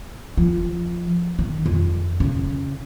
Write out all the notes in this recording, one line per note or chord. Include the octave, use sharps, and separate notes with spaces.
F3
D#3
F2
C#3